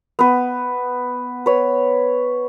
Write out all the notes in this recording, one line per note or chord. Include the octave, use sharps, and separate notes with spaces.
B3 B4
B4 C#5